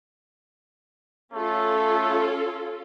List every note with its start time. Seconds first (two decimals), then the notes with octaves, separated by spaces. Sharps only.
1.34 A3 C#4 F4 A4